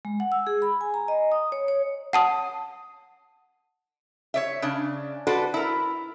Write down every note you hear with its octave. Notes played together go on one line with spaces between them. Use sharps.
G#3
F#5
E6
G#4
B5
G#5
A#5
D#5
D#6
C#5
C#5
F#5 A5 D#6
C#5 D5 E5
C#3 D4
F#4 A4 B4 C5 D5
E4 A#4